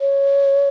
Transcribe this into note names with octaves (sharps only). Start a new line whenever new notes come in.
C#5